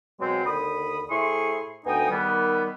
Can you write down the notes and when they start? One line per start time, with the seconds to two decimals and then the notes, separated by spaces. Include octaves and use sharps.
0.20 B2 F#3 G#3 C4
0.45 D#2 D3 B5 D#6
1.10 A2 E4 G#4 C5 C6 C#6
1.86 D2 B3 D#4 G5 G#5 D#6
2.10 D#3 G3 B3